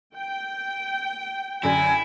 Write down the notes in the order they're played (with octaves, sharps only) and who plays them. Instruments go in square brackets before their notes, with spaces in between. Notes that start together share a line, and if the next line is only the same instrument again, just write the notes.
[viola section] G5
[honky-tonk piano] F#2 D3 [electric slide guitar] E4 [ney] G#5